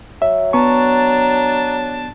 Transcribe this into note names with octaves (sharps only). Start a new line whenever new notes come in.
F#3 E5
B3 D4 A5 A#5 C#6